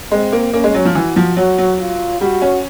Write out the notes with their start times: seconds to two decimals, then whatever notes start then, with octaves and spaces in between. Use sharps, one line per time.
0.11 G#3 C4
0.32 A#3
0.53 A#3 C#4
0.64 G#3
0.74 F#3
0.85 F3
0.95 E3 F#4
1.16 F3
1.37 F#3 F#4
1.58 F#3
1.80 F4
2.21 G3 F#4
2.42 C#4